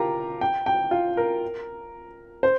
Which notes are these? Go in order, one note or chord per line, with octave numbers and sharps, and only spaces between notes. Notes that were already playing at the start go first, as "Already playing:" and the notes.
Already playing: F4 G4 A#4 A#5
G5
G5
F4
A#4
C5